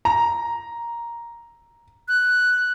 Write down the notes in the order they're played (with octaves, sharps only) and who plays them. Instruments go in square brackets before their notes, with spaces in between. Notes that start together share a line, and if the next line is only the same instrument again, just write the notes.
[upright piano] A#5
[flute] F#6